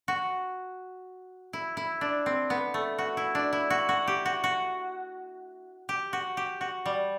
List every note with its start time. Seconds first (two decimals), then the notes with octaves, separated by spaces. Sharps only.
0.08 F#4
1.53 E4
1.77 E4
2.01 D4
2.26 C4
2.50 B3
2.74 A3
2.98 F#4
3.17 E4
3.35 D4
3.53 E4
3.70 F#4
3.89 F#4
4.08 G4
4.25 F#4
4.44 F#4
5.89 G4
6.13 F#4
6.37 G4
6.61 F#4
6.86 G3